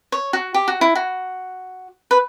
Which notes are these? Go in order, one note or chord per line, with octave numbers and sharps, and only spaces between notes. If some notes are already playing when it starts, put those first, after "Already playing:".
C#5
F#4
G4
F#4
E4
F#4
B4